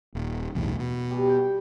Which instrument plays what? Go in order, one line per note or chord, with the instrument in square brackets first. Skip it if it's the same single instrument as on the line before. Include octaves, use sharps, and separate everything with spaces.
[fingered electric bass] D#1
B1 E2 A2
B2
[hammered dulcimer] G3
G5